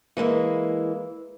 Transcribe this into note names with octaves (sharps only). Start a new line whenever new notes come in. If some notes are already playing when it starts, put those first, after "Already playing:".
E3 G#3 A#3 E4